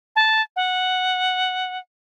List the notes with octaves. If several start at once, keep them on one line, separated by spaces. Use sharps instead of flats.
A5
F#5